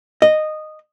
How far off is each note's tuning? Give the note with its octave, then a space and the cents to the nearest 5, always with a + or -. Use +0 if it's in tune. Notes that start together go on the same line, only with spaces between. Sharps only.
D#5 -10